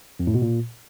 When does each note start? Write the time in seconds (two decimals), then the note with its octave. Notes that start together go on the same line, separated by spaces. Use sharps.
0.20 F2
0.27 A2
0.34 B2
0.42 A#2